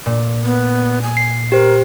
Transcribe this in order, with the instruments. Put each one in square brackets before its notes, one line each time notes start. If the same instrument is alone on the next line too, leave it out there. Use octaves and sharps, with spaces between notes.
[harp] A#2
[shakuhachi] B3
G#5
[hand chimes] C7
[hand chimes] G4 C5 [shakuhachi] A#4